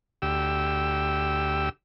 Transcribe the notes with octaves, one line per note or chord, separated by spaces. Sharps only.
D2 G4 E6